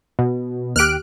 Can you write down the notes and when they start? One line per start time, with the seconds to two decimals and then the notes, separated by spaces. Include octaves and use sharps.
0.19 B2
0.76 D#2 G4 F6 F#6 D7